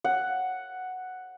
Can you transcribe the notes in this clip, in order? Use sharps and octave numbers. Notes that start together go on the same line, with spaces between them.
F#5